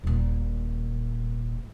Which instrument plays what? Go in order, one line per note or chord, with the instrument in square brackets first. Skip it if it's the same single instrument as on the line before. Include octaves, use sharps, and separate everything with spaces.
[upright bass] D#1 A#2